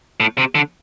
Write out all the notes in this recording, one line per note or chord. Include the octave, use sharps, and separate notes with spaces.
A2
C3
D3